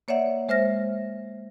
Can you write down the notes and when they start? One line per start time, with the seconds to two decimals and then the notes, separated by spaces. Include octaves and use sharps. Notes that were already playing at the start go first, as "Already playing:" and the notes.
0.08 A#3 C#5 D5 E5 F#5
0.49 G#3 C5 E5 F6 A#6